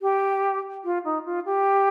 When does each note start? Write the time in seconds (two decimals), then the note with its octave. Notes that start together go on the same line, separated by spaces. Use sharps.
0.02 G4
0.84 F4
1.04 D#4
1.25 F4
1.45 G4